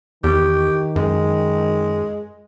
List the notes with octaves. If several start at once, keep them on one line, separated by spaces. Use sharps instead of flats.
E2 D#3 G4
F#2 G#3